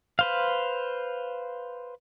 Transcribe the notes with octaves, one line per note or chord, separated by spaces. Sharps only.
B4 C5 F5